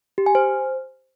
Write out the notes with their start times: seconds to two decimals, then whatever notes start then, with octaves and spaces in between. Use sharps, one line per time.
0.18 G4
0.26 G#5
0.35 C5